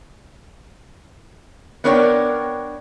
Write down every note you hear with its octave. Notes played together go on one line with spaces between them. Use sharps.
B3 D4 A#4 C#5 F5 G5